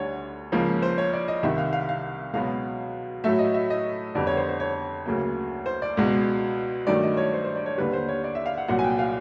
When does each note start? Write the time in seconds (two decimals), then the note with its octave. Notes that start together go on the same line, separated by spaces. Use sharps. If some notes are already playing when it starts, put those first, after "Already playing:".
Already playing: D2 D3 G3 C#5
0.52 C#2 C#3 F3 A#3
0.82 C5
0.98 C#5
1.13 D5
1.28 D#5
1.43 C2 C3 D#3 E5
1.58 F5
1.73 F5
1.89 F5
2.33 C#2 B2 F#3 B3 F5
3.24 A2 F#3 A3 E5
3.39 D#5
3.54 E5
3.70 D#5
4.15 F2 D3 G3 B3 D5
4.27 C#5
4.37 C5
4.49 C5
4.60 C#5
5.06 D2 C#3 F#3 A#3
5.66 C5
5.82 D5
5.97 C#2 B2 G#3 B3
6.87 G2 D#3 F#3 A3 D5
7.03 D#5
7.17 C#5
7.33 C5
7.44 C5
7.56 D5
7.66 C#5
7.78 D#2 D3 G3 B4
7.93 C5
8.09 C#5
8.24 D5
8.35 E5
8.46 F5
8.57 F#5
8.68 C2 A#2 F#3 F#5
8.79 G#5
8.84 G5
8.99 F5